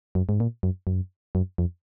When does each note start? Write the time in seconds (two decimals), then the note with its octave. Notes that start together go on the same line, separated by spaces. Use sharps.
0.15 F#2
0.29 G#2
0.40 A#2
0.63 F#2
0.87 F#2
1.35 F#2
1.58 F2